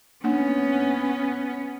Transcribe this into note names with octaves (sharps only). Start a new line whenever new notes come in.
A#3 B3 C#4 D4 F#5